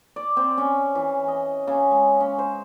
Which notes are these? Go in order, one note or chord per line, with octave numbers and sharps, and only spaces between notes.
D5
C4
C#4
E3
D#5
C#3
G#3
C#4
C5